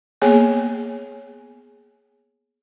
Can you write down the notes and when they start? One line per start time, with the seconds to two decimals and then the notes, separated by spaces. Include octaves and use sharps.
0.22 A#3 B3 G#4 C#5 G#5